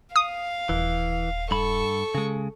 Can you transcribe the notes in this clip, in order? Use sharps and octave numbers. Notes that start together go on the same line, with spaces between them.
F5 D#6
D#1 E3
G2 A4 B5 C#6
C#3 G#3